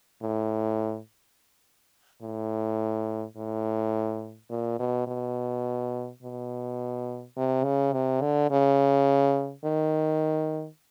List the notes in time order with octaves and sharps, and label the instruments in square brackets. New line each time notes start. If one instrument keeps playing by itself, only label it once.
[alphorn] A2
A2
A2
A#2
B2
B2
B2
C3
C#3
C3
D3
C#3
D#3